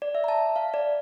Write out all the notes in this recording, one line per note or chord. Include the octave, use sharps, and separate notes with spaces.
D5
E5
A#5
A5
F5
D5